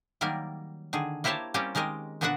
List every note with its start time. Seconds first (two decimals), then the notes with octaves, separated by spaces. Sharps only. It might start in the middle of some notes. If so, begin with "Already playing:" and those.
0.21 D#3 F#3 G3 A#3 A#4
0.93 D3 D#3 G#4
1.24 A#3 E4 G4 C5 C#5 A5
1.54 G3 A#3 C4 C#4 G4
1.75 D#3 G#3 G4 A#4 D#5
2.21 A#2 D3 B3 D4 F#4 F#5